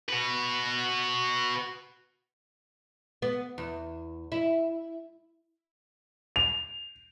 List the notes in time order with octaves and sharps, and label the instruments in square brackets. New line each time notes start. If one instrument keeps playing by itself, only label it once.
[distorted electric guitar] F#4 B4
[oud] B3
E2
E4
[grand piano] F7